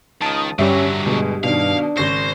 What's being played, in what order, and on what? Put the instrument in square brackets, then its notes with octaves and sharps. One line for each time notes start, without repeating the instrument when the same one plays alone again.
[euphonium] C#2 [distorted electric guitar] D#3 [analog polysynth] A5 D#6
[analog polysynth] G2 G3 [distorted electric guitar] D3 F#3 [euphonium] C#4 [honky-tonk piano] E5 C#6
[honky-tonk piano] G1 B2 [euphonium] G#3
[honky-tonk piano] B2 D#3 [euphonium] D4 [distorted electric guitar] F5
[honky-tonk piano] G#1 C#3 C#6 [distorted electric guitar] C5 [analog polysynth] A#6